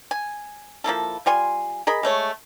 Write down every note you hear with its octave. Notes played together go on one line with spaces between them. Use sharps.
G#5
F3 A#3 E4 A4
G3 F4 G#5 C6
G#4 A#4 D#5 B5
G#3 A3 C#5